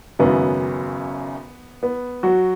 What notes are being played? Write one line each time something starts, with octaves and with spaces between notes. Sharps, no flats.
G#1 F#2 C#3 B3
B3
F#3 F#4